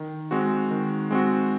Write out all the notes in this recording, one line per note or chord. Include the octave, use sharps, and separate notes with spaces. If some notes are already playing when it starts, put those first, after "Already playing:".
Already playing: D#3
G#3 C4 F#4
D#3
G#3 C4 F#4